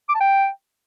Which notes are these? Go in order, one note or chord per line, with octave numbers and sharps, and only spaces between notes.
D6
A5
G5